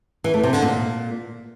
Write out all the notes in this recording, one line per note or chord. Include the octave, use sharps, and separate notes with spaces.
E3
A3
C3
D3
A#2